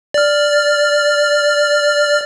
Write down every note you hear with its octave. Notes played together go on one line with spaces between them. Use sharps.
D5 F6